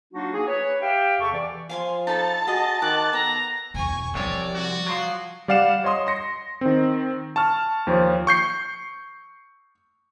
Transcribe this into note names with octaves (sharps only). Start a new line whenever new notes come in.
F#3 A#3 D4 D#4 F4 F#4
A#3 D#4 G#4
B4 C#5
G4 E5 F5 G5
E2 C3 B3 A4 A5 C#6
E3 D5
F3 F5 G#5 C6
D#4 A4 A5 B5
F#4 G#4 D#5
D#3 D6 F#6
B3 A4 A#5
E2 B2 G#5 C#6
C2 C3 F3 C#5 D5
F#4
F3 F#3 C6
G3 D5 F5 F#5 E7
C#5 D#5 C6 D#6
C6 A#6 C#7
D#3 C4
A5 C#6 F6
D#2 F3 C5 C#5
C#6 G6 C7